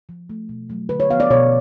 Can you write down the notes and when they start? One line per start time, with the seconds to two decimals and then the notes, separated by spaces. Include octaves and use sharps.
0.09 F3
0.30 A3
0.49 B2
0.70 F#3 A3
0.89 D3 B4
1.00 C#5
1.10 F3 B3 F5
1.20 D5
1.30 B2 C#5